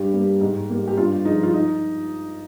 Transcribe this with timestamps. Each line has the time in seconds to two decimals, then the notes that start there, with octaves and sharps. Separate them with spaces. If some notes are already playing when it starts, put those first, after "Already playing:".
Already playing: G2 G4
0.13 G3 A#3
0.41 G#2
0.70 G3 A#3
0.88 G4
0.97 G2 F4
1.24 F3 G#3 D#4
1.43 F4
1.53 D#4